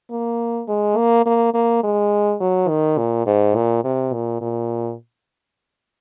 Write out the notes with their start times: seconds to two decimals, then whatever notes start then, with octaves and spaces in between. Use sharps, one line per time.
0.11 A#3
0.68 G#3
0.97 A#3
1.26 A#3
1.54 A#3
1.84 G#3
2.40 F#3
2.69 D#3
2.98 A#2
3.26 G#2
3.56 A#2
3.84 C3
4.13 A#2
4.42 A#2